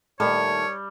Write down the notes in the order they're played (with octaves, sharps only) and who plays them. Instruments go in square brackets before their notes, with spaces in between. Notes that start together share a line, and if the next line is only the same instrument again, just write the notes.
[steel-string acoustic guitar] A#2 D#3 A3 [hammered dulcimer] G3 [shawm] C#5 [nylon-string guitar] A5